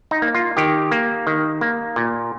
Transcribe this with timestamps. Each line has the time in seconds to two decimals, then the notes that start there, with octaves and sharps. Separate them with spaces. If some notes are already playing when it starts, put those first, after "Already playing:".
0.11 D#4
0.22 A#3
0.34 F4
0.57 D#3 G4
0.91 A#3
1.27 D#3
1.61 A#3
1.96 A#2